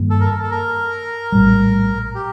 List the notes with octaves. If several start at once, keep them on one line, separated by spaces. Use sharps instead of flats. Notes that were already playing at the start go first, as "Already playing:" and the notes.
Already playing: G2 D#3 A#3
A4
A#4
A4
A4
A#4
A#1 A2 G3
G4